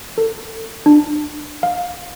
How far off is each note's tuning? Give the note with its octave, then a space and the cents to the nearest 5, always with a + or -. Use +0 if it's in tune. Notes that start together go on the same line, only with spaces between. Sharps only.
A4 +30
D4 +25
F5 +20